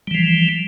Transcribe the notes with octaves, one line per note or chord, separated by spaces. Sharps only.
E3 F3 G3